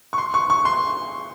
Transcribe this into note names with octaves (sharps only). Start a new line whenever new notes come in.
C#6
C6
C#6
C#6
C6